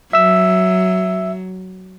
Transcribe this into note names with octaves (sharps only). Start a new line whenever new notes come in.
F#3 E5 E6